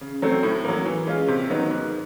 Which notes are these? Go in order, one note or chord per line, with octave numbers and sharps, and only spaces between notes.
C#3
F#3 A3 C4
A2
F#3 A#3
E3
G#3 C#4 F4
C3
D#3 F#3 B3 D#4
G#2